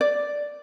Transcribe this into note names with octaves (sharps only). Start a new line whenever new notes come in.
D5